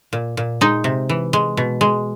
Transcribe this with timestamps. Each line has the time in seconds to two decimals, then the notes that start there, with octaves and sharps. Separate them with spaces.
0.13 A#2
0.37 A#2
0.61 G#3 D#4
0.84 C3
1.09 E3
1.33 G#3
1.57 B2
1.81 G#3